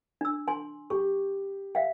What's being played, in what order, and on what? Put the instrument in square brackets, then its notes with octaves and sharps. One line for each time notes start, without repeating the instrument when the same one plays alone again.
[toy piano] D4 E6
G#5 C6
[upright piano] G4 [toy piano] C#6
[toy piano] E5 F5 G5